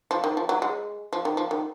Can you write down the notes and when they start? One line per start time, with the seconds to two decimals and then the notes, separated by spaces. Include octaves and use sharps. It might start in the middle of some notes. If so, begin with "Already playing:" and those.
0.11 F3
0.24 D#3
0.37 F3
0.49 F#3
0.62 G#3
1.13 F3
1.25 D#3
1.37 F3
1.51 D#3